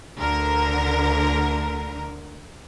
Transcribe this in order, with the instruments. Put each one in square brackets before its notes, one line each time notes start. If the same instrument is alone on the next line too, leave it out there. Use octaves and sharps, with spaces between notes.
[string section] D2 D3 A#4